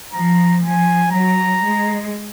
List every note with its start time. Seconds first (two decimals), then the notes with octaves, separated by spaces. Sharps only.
0.13 F3 A#5
0.62 F3 G#5
1.12 F#3 A#5
1.61 G#3